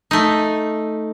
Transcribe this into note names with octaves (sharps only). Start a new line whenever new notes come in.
A3 D#4